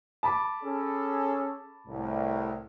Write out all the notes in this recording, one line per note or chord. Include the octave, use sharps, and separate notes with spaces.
A5 B5 D6
C#4 G#4 A4
C2 A2